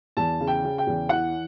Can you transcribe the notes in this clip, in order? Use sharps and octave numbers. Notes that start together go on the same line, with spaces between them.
E2 A5
C#3
G5
C#3
G5
E2
E3 F#5